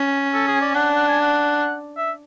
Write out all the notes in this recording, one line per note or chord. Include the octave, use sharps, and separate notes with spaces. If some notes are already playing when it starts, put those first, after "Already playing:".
Already playing: C#4
A4
G#4
D5
D4 F#5
F#5
G#5
F#5
E5